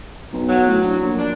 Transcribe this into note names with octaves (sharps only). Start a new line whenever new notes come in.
B1
F#3
A2
D2
A#1
D4